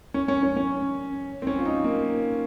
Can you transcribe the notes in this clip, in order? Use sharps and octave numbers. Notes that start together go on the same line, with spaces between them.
C#4
C#4
C#4
C#4
C4
C#4
F4
D#4
A#3